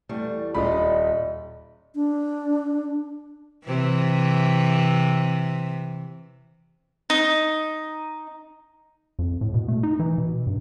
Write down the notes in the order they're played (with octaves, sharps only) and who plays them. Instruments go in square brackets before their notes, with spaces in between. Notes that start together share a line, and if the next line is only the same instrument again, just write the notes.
[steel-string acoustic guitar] E2 G3 A3
[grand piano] D#1 B5 [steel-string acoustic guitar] F4 D5 D#5
[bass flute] D4
[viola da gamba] C3 E3
[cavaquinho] D#4
[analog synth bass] F2
A2
B2
A3
D#4
E3
B2
G2